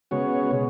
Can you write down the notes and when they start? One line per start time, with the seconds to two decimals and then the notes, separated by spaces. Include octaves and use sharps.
0.11 C#3 G#3 B3 F#4 C#5
0.51 B2 G#3